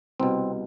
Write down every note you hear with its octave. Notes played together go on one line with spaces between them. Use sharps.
C2 B2 C4